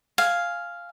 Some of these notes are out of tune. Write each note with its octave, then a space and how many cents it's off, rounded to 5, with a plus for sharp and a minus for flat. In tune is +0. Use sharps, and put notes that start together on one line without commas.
F5 -5 G#5 +0